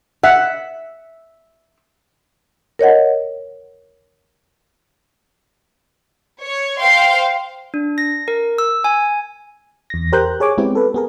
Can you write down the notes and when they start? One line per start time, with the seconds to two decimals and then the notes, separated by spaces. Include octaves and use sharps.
0.23 E5 F#5
2.79 A#4 C#5 D#5 F#5
6.42 C#5
6.79 C5 F5 G5 C6
7.74 D4
7.98 A#6
8.28 A#4
8.58 E6
8.84 G#5
9.90 E2 A#6
10.12 G4 A#4 C5 A#5 F#6 G6
10.40 G#4 C#5 G#5 D6
10.58 G#3 B3 C4 E4 G4
10.75 A4 B4
10.94 B3 G#4 A#4